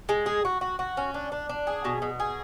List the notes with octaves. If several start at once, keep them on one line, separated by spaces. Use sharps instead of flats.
G#3
G#4
F#4
F#4
F#4
C#4
D4
D4
D4
G#4
B2
B2
G#4